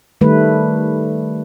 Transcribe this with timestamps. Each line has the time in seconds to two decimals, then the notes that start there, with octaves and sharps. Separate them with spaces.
0.21 D#3 G3 A3 B4